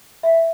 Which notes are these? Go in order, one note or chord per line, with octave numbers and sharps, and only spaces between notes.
E5